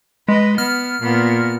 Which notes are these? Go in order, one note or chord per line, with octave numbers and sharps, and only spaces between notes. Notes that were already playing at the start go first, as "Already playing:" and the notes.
G#3 B4 D#5
B3 F6
A#2 B3